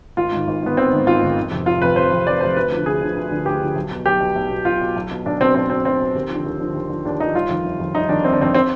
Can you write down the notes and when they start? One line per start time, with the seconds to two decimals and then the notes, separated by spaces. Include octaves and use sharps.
0.17 G#1 F4
0.32 G#2 D#3
0.47 G#1
0.63 G#2 D#3 B3
0.77 G#1 C4
0.93 G#2 D#3
1.06 G#1 F4
1.21 G#2 D#3
1.37 F1
1.51 F2 C3
1.66 F1 F4
1.81 F2 C3 B4
1.96 F1 C5
2.12 F2 C3
2.27 F1 D5
2.41 F2 C3 C5
2.57 D2 B4
2.72 D3 F3
2.86 D2 G#4
3.01 D3 F3
3.16 D2
3.31 D3 F3
3.46 D2 G4
3.62 D3 F3
3.75 B1
3.91 B2
4.06 B1 G4
4.20 B2
4.36 B1
4.51 B2
4.65 B1 F4
4.81 B2
4.96 B1
5.11 B2
5.26 B1 D4
5.40 B2 C4
5.55 B1 C4
5.70 B2 C4
5.85 B1 C4
6.00 B2
6.15 D#2
6.30 D3 F3
6.45 D#2
6.60 D3 F3
6.75 D#2
6.89 D3 F3
7.05 D#2 D4
7.20 D3 D#4
7.23 F3
7.34 G1 F4
7.49 F2 D#3
7.64 G1
7.80 F2 D#3
7.94 G1 D#4
8.09 F2 D#3 D4
8.24 G1 C4
8.33 D4
8.40 F2 D#3 C4
8.54 C4